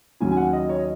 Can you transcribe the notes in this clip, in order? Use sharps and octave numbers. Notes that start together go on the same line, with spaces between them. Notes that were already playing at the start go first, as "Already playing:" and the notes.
D#2 C#3 F#3 C#4 G#5
G#5
F#5
D#5
C#5
D#5